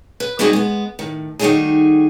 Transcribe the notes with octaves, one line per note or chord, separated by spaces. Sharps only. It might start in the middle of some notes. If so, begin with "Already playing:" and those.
B4
G3 B3 C4 D#4 F#4 G#4
G#3 B3
A2 D#3
D#3 G3 A3 D#4 F#4 G#4